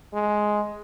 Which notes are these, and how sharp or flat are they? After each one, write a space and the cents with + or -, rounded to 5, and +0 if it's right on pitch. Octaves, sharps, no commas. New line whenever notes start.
G#3 +10